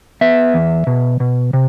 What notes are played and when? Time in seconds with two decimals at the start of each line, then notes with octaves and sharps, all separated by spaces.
0.21 B3 E5
0.54 E2
0.87 B2
1.20 B2
1.53 C3